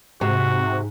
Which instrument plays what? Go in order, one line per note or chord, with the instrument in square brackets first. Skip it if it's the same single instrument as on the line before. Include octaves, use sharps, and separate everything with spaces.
[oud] G#2 [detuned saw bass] C3 [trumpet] F#4